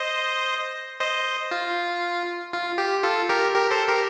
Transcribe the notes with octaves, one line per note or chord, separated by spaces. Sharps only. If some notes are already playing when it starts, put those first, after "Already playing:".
Already playing: C5 D#5
C5 D#5
F4
F4
G4
F4 A4
G4 A#4
G4 A#4
A4 C5
G4 A#4